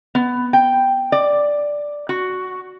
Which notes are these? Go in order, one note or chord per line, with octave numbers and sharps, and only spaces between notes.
B3
G5
D5
F#4